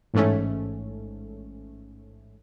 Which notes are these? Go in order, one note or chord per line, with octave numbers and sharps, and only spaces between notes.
A1 G#2 A3 C#4